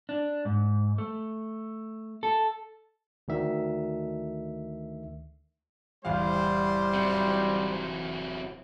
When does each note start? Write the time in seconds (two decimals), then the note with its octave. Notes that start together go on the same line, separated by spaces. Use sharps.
0.09 D4
0.45 G#2
0.98 A3
2.23 A4
3.28 D2 D#3 E5
6.05 D1 E2 G3 C5 F5
6.94 C3 F#3